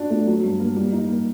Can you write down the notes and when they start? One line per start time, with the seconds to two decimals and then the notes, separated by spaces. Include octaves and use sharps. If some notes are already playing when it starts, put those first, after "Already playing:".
Already playing: D4 F#4
0.10 A3
0.27 F#3
0.44 G2
0.60 A#3
0.76 G3
0.92 D#4
1.09 A#3